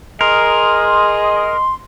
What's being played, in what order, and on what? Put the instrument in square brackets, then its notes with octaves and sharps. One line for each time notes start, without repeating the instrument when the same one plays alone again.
[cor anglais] G#4 [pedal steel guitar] A#4 [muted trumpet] D#5 [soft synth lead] C6